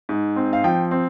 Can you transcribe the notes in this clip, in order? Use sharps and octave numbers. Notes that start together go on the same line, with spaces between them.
G#2
C4
F5
F3 G5
C4